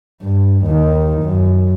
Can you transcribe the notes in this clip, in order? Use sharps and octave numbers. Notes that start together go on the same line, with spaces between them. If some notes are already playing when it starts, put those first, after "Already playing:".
G2
D#2 D#3
F#2